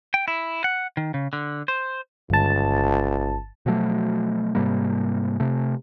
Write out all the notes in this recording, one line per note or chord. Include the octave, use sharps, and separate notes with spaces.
G5
E4
F#5
D#3
C#3
D3
C5
G1 C#2 A5
B2 F3 F#3 A3
G#2 C3 G3 A#3
C3 A3